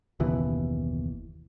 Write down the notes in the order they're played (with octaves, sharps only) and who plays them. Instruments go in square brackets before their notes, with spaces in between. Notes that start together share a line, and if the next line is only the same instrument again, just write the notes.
[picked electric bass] F#1 D#2 B2 E3